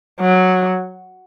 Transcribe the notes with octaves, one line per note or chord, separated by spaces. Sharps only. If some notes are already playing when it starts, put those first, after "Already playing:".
F#3